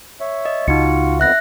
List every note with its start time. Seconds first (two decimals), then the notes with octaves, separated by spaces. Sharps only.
0.21 C#5 E5
0.46 D#5
0.68 C#2 D#4 F4 F#4 C#7
1.20 F2 B3 E5 F#6 A#6